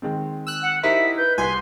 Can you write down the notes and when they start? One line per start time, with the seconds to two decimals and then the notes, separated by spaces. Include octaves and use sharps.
0.02 D#3 G#3 C4
0.47 E6 F#6
0.62 F#5
0.83 D#4 E4 G4 A#4 C5 E5 B6
1.17 B4 G6
1.38 C2 G#5 C6 B6